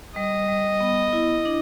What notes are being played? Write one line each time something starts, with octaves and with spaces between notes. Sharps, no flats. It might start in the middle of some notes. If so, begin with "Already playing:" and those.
G3 D#5
G3
B3
E4
D4